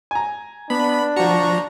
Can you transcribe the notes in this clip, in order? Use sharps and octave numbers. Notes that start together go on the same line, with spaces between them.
G#5 A#5
B3 D4 B5
F3 F#4 A#5 C#6